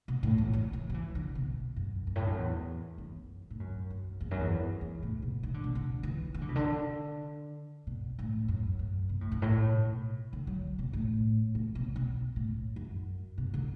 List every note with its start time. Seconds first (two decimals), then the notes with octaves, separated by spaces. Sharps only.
0.08 B2
0.23 A2
0.38 E2
0.53 F#2
0.73 E3
0.89 F#3
0.94 E3
1.15 D3
1.35 B2
1.76 F#2
2.07 F#2
2.16 A2
2.27 F#2
2.37 E2
2.98 F#2
3.50 A2
3.60 F#2
3.90 F#2
4.21 E2
4.31 F#2
4.40 E2
4.81 E2
5.03 A2
5.22 B2
5.43 E3
5.54 D3
5.64 B2
5.75 D3
6.03 E3
6.34 E3
6.41 D3
6.49 B2
6.56 D3
7.87 B2
8.19 A2
8.48 F#2
8.79 F#2
9.09 B2
9.21 A2
9.32 F#2
9.42 A2
9.71 B2
10.33 D3
10.47 F#3
10.79 B2
10.93 A2
11.55 A2
11.75 B2
11.96 B2
12.36 A2
12.76 F#2
13.38 B2
13.54 D3